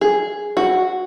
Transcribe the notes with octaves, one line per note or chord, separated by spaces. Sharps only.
G#4
F#4